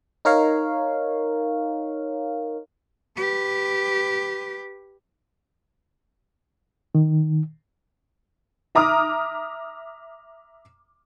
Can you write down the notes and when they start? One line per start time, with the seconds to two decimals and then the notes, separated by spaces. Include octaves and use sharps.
0.25 D#4 A#4 C#5 F5
3.17 G4 B4
6.95 D#3
8.75 E5 A#5 D6 D#6 F6